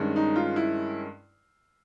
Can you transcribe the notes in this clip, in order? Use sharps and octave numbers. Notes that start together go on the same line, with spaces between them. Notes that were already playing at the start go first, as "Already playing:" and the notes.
Already playing: G2 D#3 G#3 C#4
D#4
F4
E4